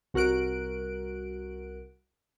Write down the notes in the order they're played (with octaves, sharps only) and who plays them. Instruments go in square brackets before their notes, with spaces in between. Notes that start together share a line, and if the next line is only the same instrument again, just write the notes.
[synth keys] C2 F#4 A#4 F#6 D7